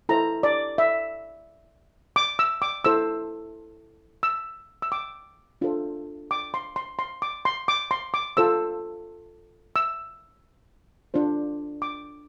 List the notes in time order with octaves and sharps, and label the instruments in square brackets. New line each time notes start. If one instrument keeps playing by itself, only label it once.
[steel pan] E4 A4 C5 A#5
D5
E5
D6
E6
D6
E4 A4 C5 E6
E6
E6
D6
D4 F4 A4 C5
D6
C6
C6
C6
D6
C6
D6
C6
D6
F4 A4 C5 E6
E6
D4 F4 C5
D6